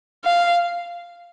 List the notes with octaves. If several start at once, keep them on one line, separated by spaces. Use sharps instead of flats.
F5